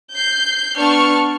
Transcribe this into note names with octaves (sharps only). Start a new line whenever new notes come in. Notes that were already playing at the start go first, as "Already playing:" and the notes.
G6 C7
B3 D4 A5 C#6 F6